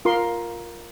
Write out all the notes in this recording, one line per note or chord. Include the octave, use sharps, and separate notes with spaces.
F4 A#4 C6